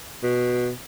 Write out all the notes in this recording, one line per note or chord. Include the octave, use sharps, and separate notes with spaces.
B2